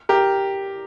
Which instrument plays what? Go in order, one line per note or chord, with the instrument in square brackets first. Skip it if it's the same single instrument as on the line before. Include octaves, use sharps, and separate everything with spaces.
[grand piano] G4 A#4